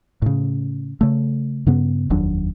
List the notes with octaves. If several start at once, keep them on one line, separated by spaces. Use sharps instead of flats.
A2 C#3
C#3 A3
G2 C#3 B3
F1 D#2 F#3 D4